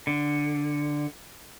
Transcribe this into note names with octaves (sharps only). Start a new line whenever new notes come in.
D3